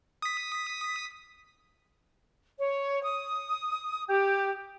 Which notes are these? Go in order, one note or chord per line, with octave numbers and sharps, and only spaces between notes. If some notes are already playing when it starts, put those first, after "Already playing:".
D#6 B6
C#5
D#6
G4